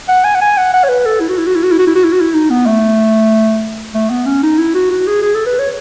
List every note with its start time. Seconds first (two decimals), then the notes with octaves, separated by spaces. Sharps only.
0.09 F#5
0.24 G#5
0.35 F#5
0.42 G#5
0.58 F#5
0.74 F#5
0.84 C#5
0.89 B4
1.06 A4
1.21 E4
1.29 F#4
1.38 E4
1.47 F#4
1.55 E4
1.63 F#4
1.72 E4
1.79 F#4
1.87 E4
1.96 F#4
2.04 E4
2.13 F#4
2.20 E4
2.34 D#4
2.50 B3
2.66 A3
3.95 A3
4.10 B3
4.26 C#4
4.43 D#4
4.58 E4
4.75 F#4
4.91 F#4
5.07 G#4
5.22 G#4
5.35 A4
5.46 B4
5.59 C#5